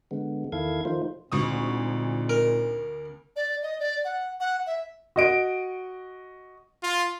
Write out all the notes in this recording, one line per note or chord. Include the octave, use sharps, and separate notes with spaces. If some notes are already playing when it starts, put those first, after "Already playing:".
D3 G#3 B3
E2 D#3 E4 A4 F5 G#6
D#3 F3 A3 D#4 F4 C5
D2 A#2 G#3 C4 D#4 C#6 D#6
A#4
D5
D#5
D5
F#5
F#5
E5
F#4 D#5 D7
F4